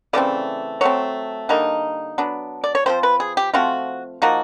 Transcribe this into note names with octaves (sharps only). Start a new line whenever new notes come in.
C#3 E3 A3 C4 D5
F#3 A3 C4 C#5
D3 G3 A#3 D#4
F#3 B3 D4
D5
C#5
F3 A3 C4 C5
B4
G#4
G4
F3 A3 C4 F4 F#4
F3 A#3 D#4 F#4